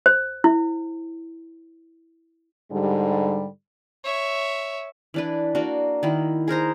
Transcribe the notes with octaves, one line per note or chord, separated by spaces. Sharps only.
C5
E4
G#2 D3 G3
C#5 E5
E3 D4 B4
A#3 D4 F#4
D#3 E4
G#4 A#4 C5 A#5